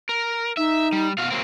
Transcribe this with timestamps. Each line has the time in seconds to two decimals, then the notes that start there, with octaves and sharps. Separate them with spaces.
0.09 A#4
0.57 D#4 E5
0.92 G3
1.18 B2 F#4 F5
1.30 F#3 A#3 C4